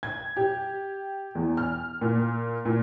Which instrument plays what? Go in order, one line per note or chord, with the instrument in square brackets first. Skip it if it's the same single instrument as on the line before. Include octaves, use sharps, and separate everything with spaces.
[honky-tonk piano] G#6
G4
E2
F6
A#2
A#2